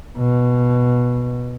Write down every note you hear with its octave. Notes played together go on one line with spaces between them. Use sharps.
B2